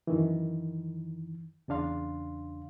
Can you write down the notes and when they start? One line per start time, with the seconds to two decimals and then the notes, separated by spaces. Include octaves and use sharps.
0.07 F#2 D#3 E3
1.68 E2 C#3 D4 F5 C6